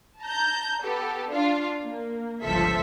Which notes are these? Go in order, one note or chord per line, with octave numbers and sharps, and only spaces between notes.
A5 A#5 G6
B3 G4 A4
D4 F4 F5
A#3
G1 C#2 F3 A4 E5 B6